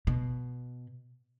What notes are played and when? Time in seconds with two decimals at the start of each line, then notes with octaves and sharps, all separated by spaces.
0.07 B2